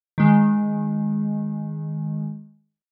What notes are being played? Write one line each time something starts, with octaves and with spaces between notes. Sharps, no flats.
D#3 G#3